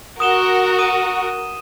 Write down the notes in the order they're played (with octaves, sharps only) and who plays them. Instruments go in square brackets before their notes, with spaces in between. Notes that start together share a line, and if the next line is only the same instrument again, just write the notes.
[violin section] F#4 A#4 [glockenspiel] D#6 E7 G7
[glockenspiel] D#6 D#7